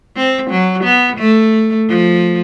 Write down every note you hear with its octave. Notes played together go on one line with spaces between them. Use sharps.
C4
F#3
B3
A3
F3